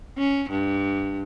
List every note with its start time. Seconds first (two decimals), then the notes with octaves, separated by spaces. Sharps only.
0.17 C#4
0.50 G2